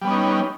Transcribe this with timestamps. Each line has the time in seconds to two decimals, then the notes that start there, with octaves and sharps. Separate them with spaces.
0.01 G3
0.04 B3
0.07 C#4
0.10 D#4